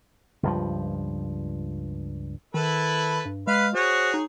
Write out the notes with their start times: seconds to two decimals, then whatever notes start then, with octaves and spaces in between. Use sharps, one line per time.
0.43 C#2 G2 F3
2.54 D#3 E4 A4 B4
3.25 G2
3.47 G#3 B4 F5
3.75 F#4 G#4 C5 C#5
4.14 D#4